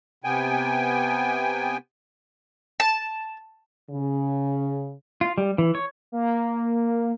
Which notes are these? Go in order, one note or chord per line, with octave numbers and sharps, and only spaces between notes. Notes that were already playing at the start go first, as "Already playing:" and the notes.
C3 B3 G5 G#5
A5
C#3
F4
G3
E3
C#5
A#3